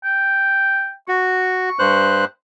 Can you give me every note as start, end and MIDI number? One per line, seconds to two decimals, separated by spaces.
0.04 0.92 79
1.08 1.69 66
1.08 2.11 85
1.79 2.25 43
1.79 2.25 72
1.79 2.25 90